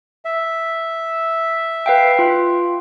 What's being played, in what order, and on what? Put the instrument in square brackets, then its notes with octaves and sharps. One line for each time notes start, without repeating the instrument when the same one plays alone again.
[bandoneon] E5
[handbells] B4 F5 G5
F4